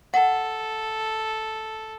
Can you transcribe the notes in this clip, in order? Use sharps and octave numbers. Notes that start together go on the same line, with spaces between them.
A4 F#5